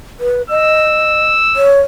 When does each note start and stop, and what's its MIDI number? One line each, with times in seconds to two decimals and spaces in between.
0.20 0.42 71
0.50 1.26 75
0.50 1.75 88
1.56 1.81 73